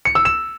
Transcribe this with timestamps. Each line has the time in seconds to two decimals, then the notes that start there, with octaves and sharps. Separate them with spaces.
0.05 C#7
0.15 E6
0.25 E7